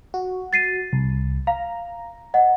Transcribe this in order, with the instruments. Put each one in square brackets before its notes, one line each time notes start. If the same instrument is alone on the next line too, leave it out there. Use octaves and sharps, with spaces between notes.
[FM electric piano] F#4
[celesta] A6 C7 D#7
[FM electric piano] C2
[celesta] F5 [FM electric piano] A#5
[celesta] D#5 F#5